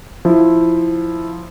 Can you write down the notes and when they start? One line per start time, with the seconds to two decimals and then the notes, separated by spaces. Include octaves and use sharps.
0.25 F3 E4